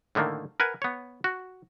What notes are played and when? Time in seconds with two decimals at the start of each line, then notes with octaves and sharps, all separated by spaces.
0.15 A2 D3 D#3 A3 A#3
0.60 A#4 B4 F#5 G#5
0.82 B3 C#5
1.24 F#4